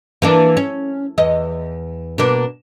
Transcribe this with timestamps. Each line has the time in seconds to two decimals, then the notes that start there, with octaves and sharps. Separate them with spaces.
0.22 E3 A#3 D4
0.57 C#4
1.18 E2 D#5
2.18 B2 A#3 D4